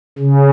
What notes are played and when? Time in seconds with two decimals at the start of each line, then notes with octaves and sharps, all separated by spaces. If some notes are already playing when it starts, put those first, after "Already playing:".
0.19 C#3